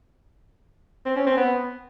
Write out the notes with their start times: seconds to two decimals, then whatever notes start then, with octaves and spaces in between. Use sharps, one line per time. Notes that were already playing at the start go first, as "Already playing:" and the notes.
1.05 C4
1.16 C#4
1.26 C4
1.37 B3